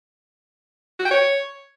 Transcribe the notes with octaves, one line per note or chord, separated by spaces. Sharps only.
F#4
G5
C#5